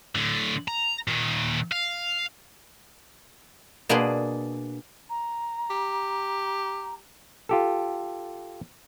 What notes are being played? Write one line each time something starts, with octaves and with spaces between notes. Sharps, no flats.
A2 D3
A#5
A#2 D#3
F5
B2 A#3 D4 G#4 B4 C6
A#5
G4
F4 G4 A4